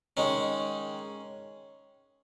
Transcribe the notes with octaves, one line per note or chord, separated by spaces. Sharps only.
D#3 G#3 C#4